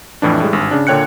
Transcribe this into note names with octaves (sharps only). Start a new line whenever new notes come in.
F2 A2 E3 D4
A2 G3 G#3
G#1 G2
C#3 D4
A#2 D3 C#5 G5 F#6 C#7